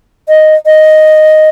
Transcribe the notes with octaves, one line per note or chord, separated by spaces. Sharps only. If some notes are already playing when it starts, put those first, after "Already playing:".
D#5
D#5